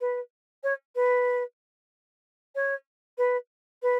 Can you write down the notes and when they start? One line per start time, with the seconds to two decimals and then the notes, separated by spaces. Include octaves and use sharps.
0.01 B4
0.64 C#5
0.95 B4
2.55 C#5
3.18 B4
3.82 B4